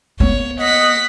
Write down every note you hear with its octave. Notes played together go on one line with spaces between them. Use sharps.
A#3 B3 C#5
D#5 F#5 B6